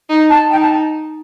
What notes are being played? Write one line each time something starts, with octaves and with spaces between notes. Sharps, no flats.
D#4
A5
D#4 G5
A5